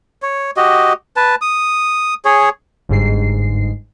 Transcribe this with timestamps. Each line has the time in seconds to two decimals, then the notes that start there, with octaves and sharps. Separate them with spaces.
0.22 C#5
0.57 F#4 G4 D#5
1.16 B4 A5
1.41 D#6
2.25 G#4 C#5
2.89 G1 G#2 C7